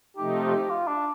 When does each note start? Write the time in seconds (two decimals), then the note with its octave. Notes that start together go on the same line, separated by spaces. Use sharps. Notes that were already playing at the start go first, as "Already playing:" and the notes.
0.17 C3 F3 A3 D#4 G4
0.70 F4
0.87 D4